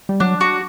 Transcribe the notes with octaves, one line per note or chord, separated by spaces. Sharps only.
G3
F#3 D4
F#4